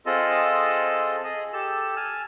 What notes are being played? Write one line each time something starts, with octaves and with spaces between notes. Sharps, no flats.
C4 F4 G#4 A4 D#5 A5
G#4 D#5
G4 A4 A5 E6
G#5 A5 F6